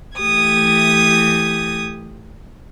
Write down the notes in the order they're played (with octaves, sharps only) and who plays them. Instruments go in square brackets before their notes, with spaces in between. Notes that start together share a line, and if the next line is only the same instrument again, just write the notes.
[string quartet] E3 A3 G4 D#6 G#6